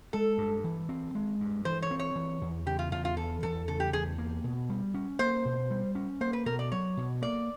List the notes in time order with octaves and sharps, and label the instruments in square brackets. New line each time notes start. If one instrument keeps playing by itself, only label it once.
[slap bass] G#3 [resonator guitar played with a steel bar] A4
[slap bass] G2
E3
C4
G#3
G2
[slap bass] E3 [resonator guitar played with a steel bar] C5
[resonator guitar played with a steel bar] C#5
[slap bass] C4
[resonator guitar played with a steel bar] C#5
[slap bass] E3
E2
[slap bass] C#3 [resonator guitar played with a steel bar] G4
[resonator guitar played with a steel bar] F4
[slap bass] E2 [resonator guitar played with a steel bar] F4
[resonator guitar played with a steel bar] F4
[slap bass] E3 [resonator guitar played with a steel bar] A4
[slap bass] E2 [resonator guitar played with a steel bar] A4
[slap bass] C#3 [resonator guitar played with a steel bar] A4
[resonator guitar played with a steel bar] G4
[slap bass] E2 [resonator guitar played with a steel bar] G#4
[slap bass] A#3
B2
G3
C#4
[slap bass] A#3 [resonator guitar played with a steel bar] C5
[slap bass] B2
G3
C#4
[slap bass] A#3 [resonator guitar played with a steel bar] C5
[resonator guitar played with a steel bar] B4
[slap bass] B2 [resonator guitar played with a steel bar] A#4
[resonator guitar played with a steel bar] D5
[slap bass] F#3 [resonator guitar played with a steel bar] C#5
[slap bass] B2
[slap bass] A#3 [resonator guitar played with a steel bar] D5